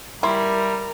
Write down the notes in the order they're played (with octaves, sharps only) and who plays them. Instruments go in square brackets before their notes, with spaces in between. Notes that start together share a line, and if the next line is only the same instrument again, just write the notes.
[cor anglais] G3 [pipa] E4 [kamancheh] A#4 [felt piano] C6